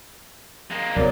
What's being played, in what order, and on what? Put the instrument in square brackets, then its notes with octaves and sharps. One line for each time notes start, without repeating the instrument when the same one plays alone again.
[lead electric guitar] G#3 A#3
[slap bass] B1 C#3 [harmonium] F#3 A#4 D5